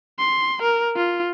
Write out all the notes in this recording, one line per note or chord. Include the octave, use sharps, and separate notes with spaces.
C6
A#4
F4